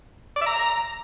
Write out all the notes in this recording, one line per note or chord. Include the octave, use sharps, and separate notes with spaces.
D5
E5
A#5